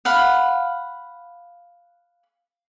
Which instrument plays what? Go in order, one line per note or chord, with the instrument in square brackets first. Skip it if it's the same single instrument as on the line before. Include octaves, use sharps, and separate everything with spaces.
[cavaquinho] F5 F#5 B5